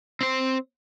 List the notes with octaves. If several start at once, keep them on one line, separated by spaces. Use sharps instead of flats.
C4 C5